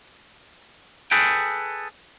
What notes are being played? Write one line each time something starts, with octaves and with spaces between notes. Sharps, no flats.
G#4 A4 B4 G5